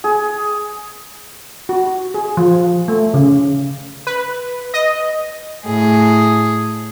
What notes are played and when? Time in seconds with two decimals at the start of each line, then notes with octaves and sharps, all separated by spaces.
0.04 G#4
1.69 F#4
2.14 G#4
2.37 F3
2.88 A3
3.14 C#3
4.07 B4
4.74 D#5
5.64 A2 G#4